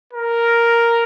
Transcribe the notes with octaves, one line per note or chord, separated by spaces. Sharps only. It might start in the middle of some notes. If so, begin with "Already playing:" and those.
A#4